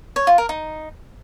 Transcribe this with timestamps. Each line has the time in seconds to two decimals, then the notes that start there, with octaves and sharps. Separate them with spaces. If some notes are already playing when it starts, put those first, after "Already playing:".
0.16 C#5
0.27 F4
0.38 A#4
0.49 D#4